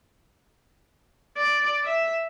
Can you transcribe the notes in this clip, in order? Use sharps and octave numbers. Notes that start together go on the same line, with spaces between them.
D5
E5